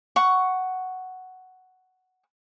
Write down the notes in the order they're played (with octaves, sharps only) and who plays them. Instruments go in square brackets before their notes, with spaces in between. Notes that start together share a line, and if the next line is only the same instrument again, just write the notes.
[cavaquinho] F#5 C#6